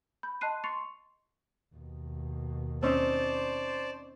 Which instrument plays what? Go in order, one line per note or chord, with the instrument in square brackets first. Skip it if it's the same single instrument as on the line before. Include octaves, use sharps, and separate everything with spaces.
[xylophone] B5 G6
D#5 A5 C6 F#6 C7 D#7
C6 C#6 A6 C7 C#7 F7
[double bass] D#2 B2
[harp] C4 C#4 D#4 [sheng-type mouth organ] C5 D5 A5